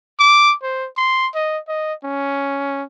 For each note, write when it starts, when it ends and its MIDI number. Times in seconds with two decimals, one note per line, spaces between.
0.19 0.54 86
0.63 0.87 72
0.97 1.28 84
1.35 1.59 75
1.68 1.93 75
2.04 2.83 61